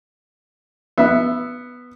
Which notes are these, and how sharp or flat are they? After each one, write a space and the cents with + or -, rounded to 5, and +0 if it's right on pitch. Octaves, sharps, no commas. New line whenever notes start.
B3 +0 E5 +0